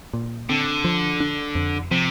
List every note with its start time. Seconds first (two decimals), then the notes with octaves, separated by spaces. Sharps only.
0.13 A#2
0.49 D3 C4
0.84 F3
1.20 D4
1.55 F2
1.91 C3 F3